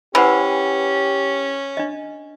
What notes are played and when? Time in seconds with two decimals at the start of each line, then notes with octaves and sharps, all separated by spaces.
0.15 E3 C#4 G4 B4 C5 F#5
1.77 D4 D#5